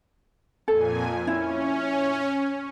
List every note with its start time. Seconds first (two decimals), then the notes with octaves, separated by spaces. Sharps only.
0.68 F2 A#2 A4 G#5
1.27 C#4 E4